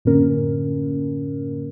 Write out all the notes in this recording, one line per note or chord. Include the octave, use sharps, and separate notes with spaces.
F#2 A2 D3 A#3 C#4 A#4